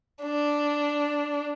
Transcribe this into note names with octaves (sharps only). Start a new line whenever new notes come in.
D4